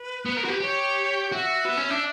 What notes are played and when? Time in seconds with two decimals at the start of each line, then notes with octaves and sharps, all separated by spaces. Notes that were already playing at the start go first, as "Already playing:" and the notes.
Already playing: B4
0.25 B3
0.37 A#4
0.45 F#4
0.48 G4
0.60 G4 C#5
1.32 F#4 E5
1.65 B3
1.77 C#4
1.90 D4